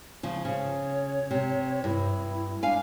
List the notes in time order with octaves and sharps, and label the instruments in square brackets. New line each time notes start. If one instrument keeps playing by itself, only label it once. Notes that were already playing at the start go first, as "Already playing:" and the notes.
[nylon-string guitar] C#3 F3
[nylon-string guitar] C#3 [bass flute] C#5
[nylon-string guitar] C3
[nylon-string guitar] G2 [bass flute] E4
[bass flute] D4 [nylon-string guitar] F5 G#5